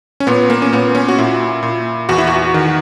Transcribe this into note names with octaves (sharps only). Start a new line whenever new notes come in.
C#4
A#2 B3
A#3
C#4
A#2 B3
C#4
F#4
A#2 E4
A#2
E2 F#4
E4
F#4
D#3